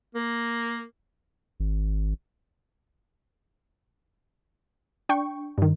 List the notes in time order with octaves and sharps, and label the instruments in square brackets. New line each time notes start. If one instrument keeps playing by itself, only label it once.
[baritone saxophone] A#3
[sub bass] G#1
[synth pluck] D4 G5 C#6
G2 D#3